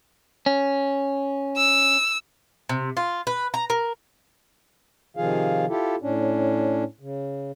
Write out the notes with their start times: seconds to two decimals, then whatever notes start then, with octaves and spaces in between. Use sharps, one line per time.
0.46 C#4
1.57 E6
2.69 C3
2.97 F4
3.27 B4
3.54 A#5
3.70 A#4
5.17 C3 D#3 F3 F4 G#4 F5
5.69 E4 F4 G4 A4
6.02 A2 C#4 D4
7.00 C#3